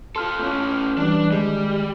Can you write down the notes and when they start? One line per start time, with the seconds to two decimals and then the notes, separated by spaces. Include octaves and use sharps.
0.16 F4 A4 C6 F6
0.39 A3 C#4
0.97 E3 G3 D4
1.31 D#3 G3 G#3